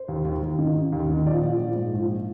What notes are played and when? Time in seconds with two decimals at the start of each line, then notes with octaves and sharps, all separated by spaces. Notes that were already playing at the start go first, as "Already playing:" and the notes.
Already playing: C5
0.08 D#2
0.25 D#2
0.42 D#2
0.59 D#3
0.75 D#3
0.92 D#2
1.09 D#3
1.26 A#1 D5
1.43 A#1
1.60 A#1
1.76 G#2
1.93 A#1